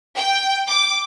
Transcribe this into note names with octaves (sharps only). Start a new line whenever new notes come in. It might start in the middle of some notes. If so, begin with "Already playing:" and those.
G5
D6